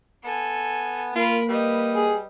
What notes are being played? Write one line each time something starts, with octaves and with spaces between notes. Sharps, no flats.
B3 A4 G#5
A#3 F4 A#4 B5
G3 B4 D#5
G#4